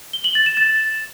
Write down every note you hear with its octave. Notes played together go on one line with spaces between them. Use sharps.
G7
F#7
A6
E7
A6